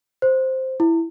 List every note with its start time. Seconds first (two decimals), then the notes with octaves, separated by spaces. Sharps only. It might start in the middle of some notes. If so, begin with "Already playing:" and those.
0.22 C5
0.80 E4